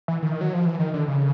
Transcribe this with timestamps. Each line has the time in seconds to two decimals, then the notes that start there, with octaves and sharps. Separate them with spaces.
0.08 E3
0.22 D#3
0.41 F#3
0.54 F3
0.65 E3
0.79 D#3
0.94 D3
1.08 C#3